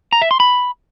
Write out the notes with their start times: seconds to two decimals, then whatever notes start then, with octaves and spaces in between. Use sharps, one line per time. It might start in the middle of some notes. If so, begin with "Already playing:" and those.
0.13 A#5
0.22 E5
0.31 C6
0.40 B5